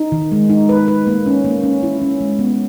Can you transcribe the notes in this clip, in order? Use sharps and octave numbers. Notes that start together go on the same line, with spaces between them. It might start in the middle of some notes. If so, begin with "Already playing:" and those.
Already playing: D#4
D#3
G#3
D#4
B4
B4
A#3
C#4
A#3
C#4
E4
C#4
G#3
B3